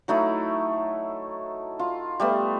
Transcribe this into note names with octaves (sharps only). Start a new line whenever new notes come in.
F#3 A3 D#4 E4
F4
G3 A3 B3